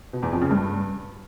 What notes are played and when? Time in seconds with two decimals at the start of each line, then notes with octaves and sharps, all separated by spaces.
0.13 B2
0.23 E2
0.32 F2
0.41 C#3
0.51 G2